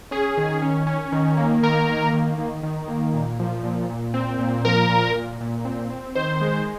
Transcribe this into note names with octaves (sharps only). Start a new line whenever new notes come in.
C#4 G#4
D#3
C#4
C#4
D#3
A#3
D#3 A#4
A#3
D#3
D#3
D#3
A#3
A#2
F3
A#2
A#2
C4
A#2
F3 A#4
A#2
A#2
A#2
C4
C4
D#3 C5
G#3